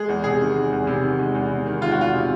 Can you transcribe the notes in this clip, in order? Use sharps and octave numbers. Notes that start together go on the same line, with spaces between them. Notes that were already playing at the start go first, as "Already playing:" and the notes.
Already playing: G#3 G#4
E2
C3 G#4
D#3
G#3
E2
C3
D#3
G#3
E2
C3
D#3
G#3 F4
F#4
E2 F4
C3